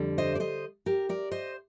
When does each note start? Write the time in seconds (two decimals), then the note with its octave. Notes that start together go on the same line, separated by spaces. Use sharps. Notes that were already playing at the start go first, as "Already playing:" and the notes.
Already playing: F2 D3 G3
0.18 C5 D#5
0.35 D5
0.40 C5 D#5
0.86 G4 A#4
1.09 A#4 D5
1.31 C5 D#5